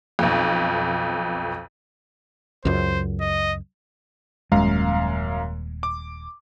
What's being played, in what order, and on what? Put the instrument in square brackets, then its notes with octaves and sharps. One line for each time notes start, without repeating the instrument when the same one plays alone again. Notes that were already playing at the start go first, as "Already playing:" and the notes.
[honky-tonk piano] B1 F2
[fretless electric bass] C#2 F#2 [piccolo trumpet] C5
[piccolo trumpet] D#5
[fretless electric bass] D#1 G#3 [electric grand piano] F#2 F5 A#5
[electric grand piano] D6